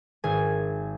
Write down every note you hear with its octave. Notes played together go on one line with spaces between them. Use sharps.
G#1 G#4 G#5